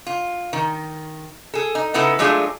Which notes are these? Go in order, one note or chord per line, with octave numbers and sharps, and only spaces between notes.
F4
D#3
G#4 A4
D#4
C#3 B3 D#4 E4 A4
F#3 G#3 A3 D4 F4 G#4